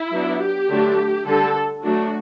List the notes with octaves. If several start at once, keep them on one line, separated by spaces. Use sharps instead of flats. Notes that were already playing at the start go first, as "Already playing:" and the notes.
Already playing: E4
F#3 B3 D4
G4
D3 F#3 A3 D4
D3 G3 D4 A4
F#3 A3 D4 F#4